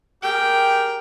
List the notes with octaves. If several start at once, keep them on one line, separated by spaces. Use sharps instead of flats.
G4 G#4 A#4 G5